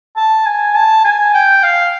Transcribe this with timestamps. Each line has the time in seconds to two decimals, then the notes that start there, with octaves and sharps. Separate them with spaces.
0.17 A5
0.46 G#5
0.75 A5
1.05 G#5
1.34 G5
1.64 F5